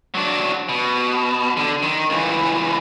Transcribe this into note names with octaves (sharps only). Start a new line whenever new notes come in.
F#3 D4
B2
D3
D#3
C#2 E3